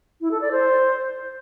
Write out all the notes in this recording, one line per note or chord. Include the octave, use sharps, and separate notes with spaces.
E4
A4
D5
C5